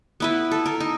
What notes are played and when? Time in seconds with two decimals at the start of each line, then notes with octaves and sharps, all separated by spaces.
0.20 B3 E4 B4
0.51 A4
0.66 A#4
0.80 D#4